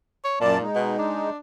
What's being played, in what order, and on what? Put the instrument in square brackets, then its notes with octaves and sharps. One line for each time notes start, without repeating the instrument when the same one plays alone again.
[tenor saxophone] C#5
[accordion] F#2 D5 A5 [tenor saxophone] A#2
[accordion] G#3 D#4
[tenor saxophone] B2
D4